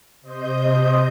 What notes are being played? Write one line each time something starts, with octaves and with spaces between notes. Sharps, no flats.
C3 C5 D#5 G6